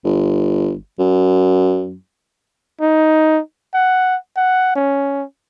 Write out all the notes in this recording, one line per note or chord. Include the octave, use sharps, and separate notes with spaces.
G1
F#2
D#4
F#5
F#5
C#4